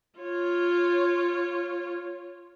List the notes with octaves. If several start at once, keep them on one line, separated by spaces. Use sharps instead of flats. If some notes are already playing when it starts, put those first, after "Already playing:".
F4 C#5